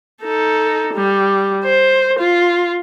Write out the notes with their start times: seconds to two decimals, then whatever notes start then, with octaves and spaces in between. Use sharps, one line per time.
0.23 D#4 A4
0.94 G3
1.65 C5
2.19 F4